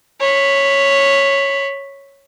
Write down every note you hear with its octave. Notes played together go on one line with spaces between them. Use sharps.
C#5 B5